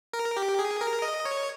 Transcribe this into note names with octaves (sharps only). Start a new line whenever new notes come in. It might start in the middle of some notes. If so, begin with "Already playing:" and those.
A#4
G4
G#4
A#4
D#5
C#5